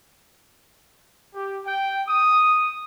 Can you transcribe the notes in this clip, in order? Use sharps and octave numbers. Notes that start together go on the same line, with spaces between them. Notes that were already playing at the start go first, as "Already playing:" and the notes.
G4
G5
D#6